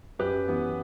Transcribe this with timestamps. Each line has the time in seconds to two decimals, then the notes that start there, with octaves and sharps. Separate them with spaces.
0.19 F#2 G4 B4
0.48 E3 B3